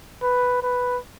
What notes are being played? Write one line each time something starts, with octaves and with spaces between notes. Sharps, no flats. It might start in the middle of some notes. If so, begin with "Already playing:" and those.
B4
B4